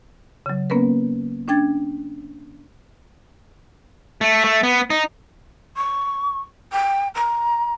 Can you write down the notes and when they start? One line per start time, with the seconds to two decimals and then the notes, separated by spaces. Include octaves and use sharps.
0.46 C#3 F#3
0.70 A#3 B3 C#4 A#4 B4
1.48 C#4 D4 G5 G#6 A6
4.21 A3
4.44 A3
4.63 B3
4.90 D#4
5.76 C#6
6.72 G5
7.14 A#5